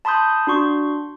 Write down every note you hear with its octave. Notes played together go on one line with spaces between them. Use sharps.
A5 B5 C6 D#6 G6
D4 F#4 C6 C#6